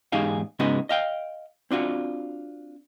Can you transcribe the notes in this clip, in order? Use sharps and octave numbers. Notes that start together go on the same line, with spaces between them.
E2 G#2 D#4 G4 G#4 F5
G#2 C#3 G#3 B3 D#4 F#4
D#5 F5 G5
C4 D4 F4 F#4